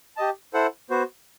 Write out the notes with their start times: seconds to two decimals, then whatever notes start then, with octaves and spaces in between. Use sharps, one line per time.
0.17 G4 D#5 A5
0.54 E4 A4 C5 F#5
0.90 B3 F#4 C5